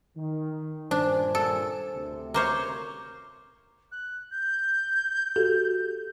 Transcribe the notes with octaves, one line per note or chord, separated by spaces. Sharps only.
D#3
G2 A#2 D4 C5 G#5
A4
D2 C3
A#3 C5 C#5 D6
F#6
G6
F#4 G4 A4